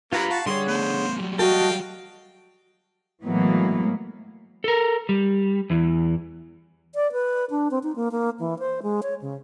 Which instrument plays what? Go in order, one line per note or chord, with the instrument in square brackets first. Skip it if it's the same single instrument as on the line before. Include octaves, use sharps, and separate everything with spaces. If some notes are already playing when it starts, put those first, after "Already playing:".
[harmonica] F#3 A#3 [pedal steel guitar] F4 A#5 B5 [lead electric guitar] G4 B4
[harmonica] F#4 A5 [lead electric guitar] F5
[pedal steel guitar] D3 G#4 C#5 [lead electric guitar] G3 [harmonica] C6
[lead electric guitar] A3 B3 [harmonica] C5
[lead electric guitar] F#3 G3
[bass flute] F#4 [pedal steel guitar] A4 D#5 [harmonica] F5 G5
[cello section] A2 E3 F#3 G#3 A#3 B3
[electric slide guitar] A4 A#4
G3
E2 E3
[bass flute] D5
B4
D4
C4
D#4
A#3
A#3
E3
C5
G#3
C#5
C#3